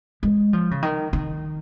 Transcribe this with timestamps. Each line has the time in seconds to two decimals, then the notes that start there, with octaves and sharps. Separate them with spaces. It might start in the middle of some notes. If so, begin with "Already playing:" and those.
0.23 G#3
0.53 F3
0.71 C#3
0.83 D#3
1.13 D#3